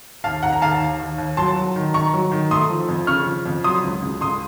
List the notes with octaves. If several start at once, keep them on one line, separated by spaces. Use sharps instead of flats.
D#2 F5 A5
D#2 F#5 A#5
A#5
D#2 F5 A5
D#2
D#2
D#2
F#3 A5 C6
F#3
D#3
D#3 A#5 C#6
F#3
D#3
A3 C6 D#6
F3
F2
C#3 C#6 F6
F3
F2
F#3 C6 D#6
C#2
C#2
C#2 C6 D#6